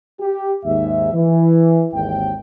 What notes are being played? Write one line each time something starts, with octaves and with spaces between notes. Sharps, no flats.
G4
D#2 G#2 E5
E3
G#1 D#2 G5